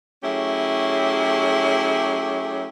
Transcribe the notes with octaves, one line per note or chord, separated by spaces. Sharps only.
F#3 A3 C#4 E4 G4 G#4